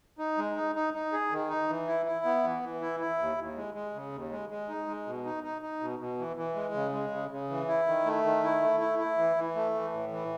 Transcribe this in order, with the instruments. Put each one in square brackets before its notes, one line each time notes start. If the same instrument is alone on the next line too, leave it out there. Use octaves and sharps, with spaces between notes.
[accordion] D#4
G#3
D#4
D#4
D#4
G#4
D#3
D#4
E3
E4
E4
B3
E3
E3
E4
E4
D#2
D#2
G#3
G#3
C#3
D#2
G#3
G#3
D#4
G#3
B2
D#4
D#4
D#4
B2
B2
E3
E3
G#3
C#3
G#3
C#3
C#3
E3
E4
D#3
A3
D#3
E4
A3
E4
E4
E3
E3
A3
E3
A2
E3